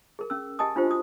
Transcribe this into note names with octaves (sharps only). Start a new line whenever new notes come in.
G#4 A#4
C#4 E6
G4 D#5 G#5 A5 D#6
D4 F4 G4 C5
F#4 D#6